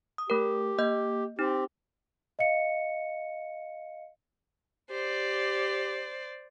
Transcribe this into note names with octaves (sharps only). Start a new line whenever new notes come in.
D#6
A3 G4 A#4
A#3 D#5 G6
C4 D#4 G4
D#5 F5 C#7
G4 C5 D5